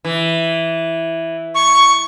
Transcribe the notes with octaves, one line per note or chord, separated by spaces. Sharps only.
E3
C#6